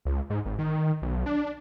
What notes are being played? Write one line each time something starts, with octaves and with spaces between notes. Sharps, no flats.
C#2
G#2
G#1
D#3
B1
D4